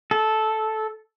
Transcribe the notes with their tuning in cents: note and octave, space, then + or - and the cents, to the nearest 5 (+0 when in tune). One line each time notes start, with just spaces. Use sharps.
A4 -10